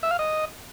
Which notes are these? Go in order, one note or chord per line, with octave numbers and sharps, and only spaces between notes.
E5
F5
D#5